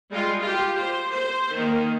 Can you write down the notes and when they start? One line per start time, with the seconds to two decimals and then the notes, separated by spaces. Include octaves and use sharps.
0.10 G3 G#3 F4
0.41 F4 G4
0.79 C5
1.12 C5
1.53 D#3 A#3